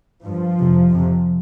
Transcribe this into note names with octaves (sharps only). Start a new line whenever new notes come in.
G2 F3
F2 C3
F2 C3